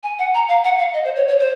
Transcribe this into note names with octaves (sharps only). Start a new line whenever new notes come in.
G#5
F#5
A#5
F5
F#5
F5
D#5
C5
C#5
C#5
C5